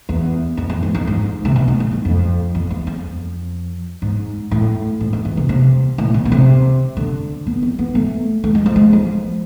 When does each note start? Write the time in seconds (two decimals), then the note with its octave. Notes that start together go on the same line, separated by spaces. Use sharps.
0.09 E2
0.57 F2
0.70 F2
0.83 G#2
0.95 F2
1.07 G#2
1.45 C3
1.56 B2
1.68 G#2
1.80 G#2
1.93 G#2
2.05 F2
2.55 F2
2.70 E2
2.87 F2
4.02 G#2
4.51 A2
5.01 G#2
5.13 F2
5.25 E2
5.37 C3
5.49 C3
5.98 A2
6.14 B2
6.25 B2
6.32 C3
6.97 D3
7.47 B3
7.63 C4
7.79 B3
7.95 A3
8.44 A3
8.55 G#3
8.66 F3
8.76 G#3
8.93 F3